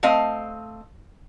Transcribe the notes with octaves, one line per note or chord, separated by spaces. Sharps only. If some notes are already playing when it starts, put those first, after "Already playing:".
A3 C4 D#5 F5